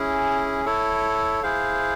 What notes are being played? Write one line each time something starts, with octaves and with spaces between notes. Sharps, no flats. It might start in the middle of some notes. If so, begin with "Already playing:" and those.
Already playing: C#4 E4 G#4
E4 A4 C#5
E4 G#4 C5 F5